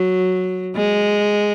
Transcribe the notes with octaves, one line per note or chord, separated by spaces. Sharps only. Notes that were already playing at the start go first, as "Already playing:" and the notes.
Already playing: F#3
G#3